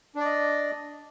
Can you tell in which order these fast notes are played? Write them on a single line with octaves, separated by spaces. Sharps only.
D4 D5 D#5